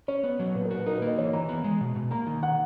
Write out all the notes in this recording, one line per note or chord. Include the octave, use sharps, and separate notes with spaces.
C#4 C#5
B3
F#3
A#2 B4
A#4
F#4
B4
D#4 A#4
B4
A#3
D#5
E3 C#5
E3 A#5
B3
G#3
B2
B2
A#3 A#5
D#3
F#5